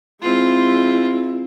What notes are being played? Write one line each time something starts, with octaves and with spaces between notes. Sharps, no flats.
G#3 C4 E4 F4